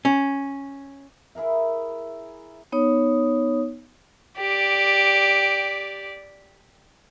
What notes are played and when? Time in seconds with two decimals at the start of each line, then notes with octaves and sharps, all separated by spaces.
0.05 C#4
1.35 E4 G#4 A#4 E5
2.72 B3 D#4 C#5 D#6
4.37 G4 D5